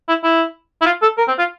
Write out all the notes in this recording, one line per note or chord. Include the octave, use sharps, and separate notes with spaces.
E4
E4
E4
F4
A4
A#4
C4
F4